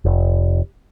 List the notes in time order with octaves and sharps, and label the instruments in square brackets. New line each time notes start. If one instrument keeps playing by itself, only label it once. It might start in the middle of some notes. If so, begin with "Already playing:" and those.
[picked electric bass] F1